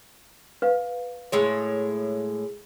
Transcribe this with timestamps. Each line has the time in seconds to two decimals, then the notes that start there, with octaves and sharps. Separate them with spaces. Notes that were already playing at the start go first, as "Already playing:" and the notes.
0.62 B4 F5
1.32 A2 G#3 C#5